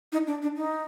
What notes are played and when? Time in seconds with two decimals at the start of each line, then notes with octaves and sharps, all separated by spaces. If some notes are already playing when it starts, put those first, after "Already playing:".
0.12 D#4
0.27 D4
0.42 D4
0.57 D#4